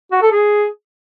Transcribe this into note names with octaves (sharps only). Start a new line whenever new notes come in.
F#4
A4
G#4